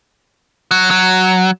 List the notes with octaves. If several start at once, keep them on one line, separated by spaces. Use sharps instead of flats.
F#3
F#3